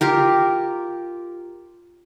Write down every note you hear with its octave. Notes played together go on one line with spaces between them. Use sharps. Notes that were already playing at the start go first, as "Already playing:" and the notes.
F4 G4 A#4